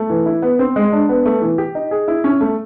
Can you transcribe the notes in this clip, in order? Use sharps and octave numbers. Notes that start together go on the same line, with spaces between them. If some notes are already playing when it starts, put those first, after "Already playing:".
Already playing: A3
E3
E4
B3
C4
G#3
D4
B3
A3
E3
G4
D#4
G#4
E4
C#4
A3